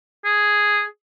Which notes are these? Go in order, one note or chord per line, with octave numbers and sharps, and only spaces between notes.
G#4